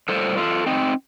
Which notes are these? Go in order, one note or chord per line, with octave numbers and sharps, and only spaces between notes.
A2 G3 A#3 A4 C5
F4 A4
C4 D#4